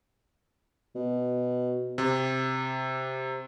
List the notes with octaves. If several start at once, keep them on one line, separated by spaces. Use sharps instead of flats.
B2
C3